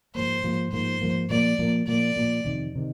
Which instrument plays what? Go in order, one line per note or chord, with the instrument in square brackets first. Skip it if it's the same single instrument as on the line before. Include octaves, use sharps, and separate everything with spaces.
[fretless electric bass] G#2 F3 A#3 [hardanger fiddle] C5
[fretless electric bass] G#2 F3 A#3
[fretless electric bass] G#2 F3 A#3 [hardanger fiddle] C5
[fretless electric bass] G#2 F3 A#3
[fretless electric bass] A#2 F3 A#3 [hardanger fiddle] D5
[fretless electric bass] A#2 F3 A#3
[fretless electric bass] A#2 F3 A#3 [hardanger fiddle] D5
[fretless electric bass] A#2 F3 A#3
F2 C3 D#3
C3 D#3